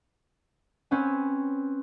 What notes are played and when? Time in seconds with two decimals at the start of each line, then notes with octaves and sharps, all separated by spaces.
0.91 C4 C#4 B4 G#5